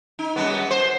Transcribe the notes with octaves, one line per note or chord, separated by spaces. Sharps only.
D#4
F#2 G3 B3
C5